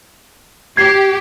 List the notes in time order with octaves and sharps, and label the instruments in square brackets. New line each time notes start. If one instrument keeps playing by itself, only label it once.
[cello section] G4 [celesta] G#6 C7